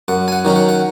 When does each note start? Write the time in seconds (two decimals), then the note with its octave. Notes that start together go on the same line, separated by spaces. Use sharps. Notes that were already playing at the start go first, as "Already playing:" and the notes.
0.08 F#2 F#5
0.28 G#5
0.32 F#5
0.45 D#3 F#3 C#4
0.56 F#5
0.69 F#5